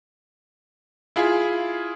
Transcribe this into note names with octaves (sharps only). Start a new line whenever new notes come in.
E4 F4 G#4